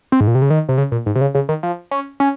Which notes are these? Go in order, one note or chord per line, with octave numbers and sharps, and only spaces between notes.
C4
G#2
A#2
C3
C#3
D#3
C3
C#3
A#2
G#2
C3
C#3
C#3
D#3
F3
C#4
C#4